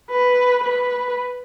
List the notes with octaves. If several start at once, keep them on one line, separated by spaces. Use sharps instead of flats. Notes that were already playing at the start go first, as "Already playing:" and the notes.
B4
B4